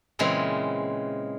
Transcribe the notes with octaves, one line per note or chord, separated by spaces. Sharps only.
A#2 C#3 E3 G#3 C4